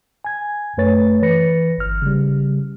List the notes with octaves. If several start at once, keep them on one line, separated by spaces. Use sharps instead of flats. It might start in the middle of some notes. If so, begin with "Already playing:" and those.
G#5 G#6
F#2 A3 B4 C#5 A6
E3 B4 A#6 C#7
G1 F6
C#3 G3